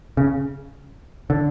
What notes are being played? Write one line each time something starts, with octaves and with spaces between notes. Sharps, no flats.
C#3
D3